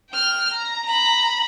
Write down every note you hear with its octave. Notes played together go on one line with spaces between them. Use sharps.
G5 F6
A#5
A#5 B5